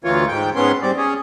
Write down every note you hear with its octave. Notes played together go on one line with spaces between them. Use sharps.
D2 E3 F4 C#5
G#2 G5
G#2 B3 C#4 C6
G3 C4 D5
C#4 G#4